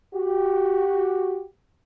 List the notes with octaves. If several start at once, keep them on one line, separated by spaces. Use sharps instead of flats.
F#4 G4